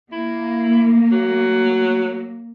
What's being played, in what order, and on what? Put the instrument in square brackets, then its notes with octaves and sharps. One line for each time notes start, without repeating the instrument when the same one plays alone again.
[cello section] A#3 [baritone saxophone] E4
[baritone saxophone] F#3